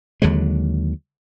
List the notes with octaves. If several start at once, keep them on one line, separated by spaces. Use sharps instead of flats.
D#2 D3 F#3 G#3